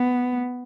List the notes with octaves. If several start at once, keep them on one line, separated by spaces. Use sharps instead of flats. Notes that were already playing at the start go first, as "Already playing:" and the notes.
Already playing: B3